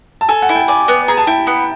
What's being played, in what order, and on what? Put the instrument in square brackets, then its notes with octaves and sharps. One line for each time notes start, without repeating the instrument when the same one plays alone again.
[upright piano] A5
[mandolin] A4 [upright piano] G#5
[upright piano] F#5
[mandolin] E4
[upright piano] G5
[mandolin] D5 [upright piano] G#5
[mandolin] B3
[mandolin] G#4 [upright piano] A#5
[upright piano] A5
[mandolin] E4 [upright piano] G5
[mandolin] B3